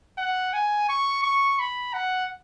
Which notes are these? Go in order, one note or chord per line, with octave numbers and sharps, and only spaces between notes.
F#5
G#5
C#6
C#6
B5
F#5